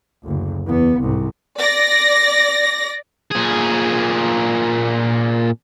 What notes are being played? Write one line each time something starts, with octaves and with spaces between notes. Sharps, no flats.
F#1 D2
E2 B3
C2 G#2
D5 A#6
A#2 G#4